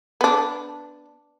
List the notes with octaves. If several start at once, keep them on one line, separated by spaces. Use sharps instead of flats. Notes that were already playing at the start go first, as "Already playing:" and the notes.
B3 D4